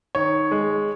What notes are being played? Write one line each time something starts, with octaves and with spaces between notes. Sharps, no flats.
D#3 C#5
G#3